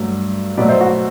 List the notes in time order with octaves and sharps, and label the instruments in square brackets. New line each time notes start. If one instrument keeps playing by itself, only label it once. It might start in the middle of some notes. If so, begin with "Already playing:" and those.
Already playing: [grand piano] G2 F#3 A3
B2 F#3 A3 B4 D5
C5 E5
F#4